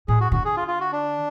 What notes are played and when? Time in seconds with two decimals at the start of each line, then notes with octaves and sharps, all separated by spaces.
0.08 A2 G#4
0.21 F#4
0.32 D3 F#4
0.45 G#4
0.57 F4
0.68 F4
0.80 F#4
0.92 D4